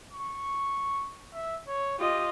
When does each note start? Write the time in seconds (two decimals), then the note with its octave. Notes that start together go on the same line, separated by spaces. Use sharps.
0.13 C#6
1.34 E5
1.68 C#5
1.99 F4 G4 D#5